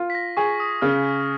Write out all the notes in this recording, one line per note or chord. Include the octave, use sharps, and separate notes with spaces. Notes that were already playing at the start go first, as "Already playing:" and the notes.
Already playing: F4
B6
A#6
G#4 C#6
D#6
C#3 F6